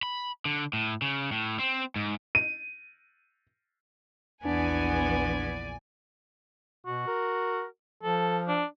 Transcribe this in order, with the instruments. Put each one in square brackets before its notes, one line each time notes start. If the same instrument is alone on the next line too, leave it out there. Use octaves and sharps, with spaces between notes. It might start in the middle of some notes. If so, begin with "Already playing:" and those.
[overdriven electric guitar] B5
D3
A2
C#3
A2
C4
G#2
[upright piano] D#7
[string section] A#1 G#5 [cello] E2 B3 [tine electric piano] D4 [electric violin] D5
[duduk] B2 [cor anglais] F#4
[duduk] A#4
[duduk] F3 [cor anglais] A4
[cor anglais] D4